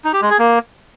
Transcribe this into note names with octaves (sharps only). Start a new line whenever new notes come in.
D#4
G4
G#3
G#4
A#3